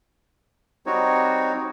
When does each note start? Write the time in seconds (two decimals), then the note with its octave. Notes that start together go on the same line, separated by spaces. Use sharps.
0.86 G3 C4 D#4 F#4 C#5